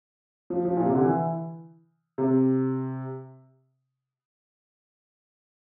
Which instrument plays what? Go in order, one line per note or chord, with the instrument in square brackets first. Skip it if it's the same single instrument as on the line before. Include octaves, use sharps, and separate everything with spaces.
[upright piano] F3
F3
A#2
C3
D3
E3
C3